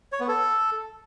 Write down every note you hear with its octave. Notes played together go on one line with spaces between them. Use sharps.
C#5
B3
A4